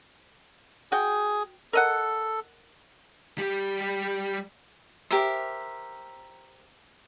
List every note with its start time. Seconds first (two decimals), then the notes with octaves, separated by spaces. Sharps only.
0.92 F#4 G#4 G5
1.73 A4 A#4 D#5 F#5
3.38 G3 G4
5.11 G4 A#4 C5 E5